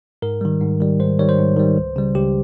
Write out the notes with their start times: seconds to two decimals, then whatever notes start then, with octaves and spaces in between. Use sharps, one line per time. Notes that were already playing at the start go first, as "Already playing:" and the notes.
0.22 G#2 A#4
0.41 D#3 G3
0.61 G#2
0.80 D#3 G3
1.00 G#2 C5
1.19 D#3 G3 C#5
1.29 C5
1.38 G#2
1.57 D#3 G3
1.77 C#2
1.96 C#3 G3
2.14 C#2 G4